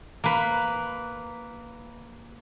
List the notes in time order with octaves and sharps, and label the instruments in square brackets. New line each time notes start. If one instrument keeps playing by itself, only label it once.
[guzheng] A#3 B4